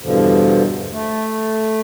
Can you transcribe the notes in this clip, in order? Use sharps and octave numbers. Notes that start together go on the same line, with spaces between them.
E2 G2 B2 D3 F3
A3